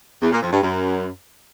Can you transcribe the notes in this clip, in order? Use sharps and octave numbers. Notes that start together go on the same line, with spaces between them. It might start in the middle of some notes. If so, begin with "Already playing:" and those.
E2
A#2
F2
G2
F#2